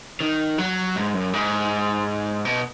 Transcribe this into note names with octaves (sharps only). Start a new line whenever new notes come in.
D#3
F#3
G#2
F#2
G#2
B2